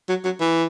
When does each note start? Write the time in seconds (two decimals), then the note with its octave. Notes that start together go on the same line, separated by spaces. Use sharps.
0.09 F#3
0.25 F#3
0.41 E3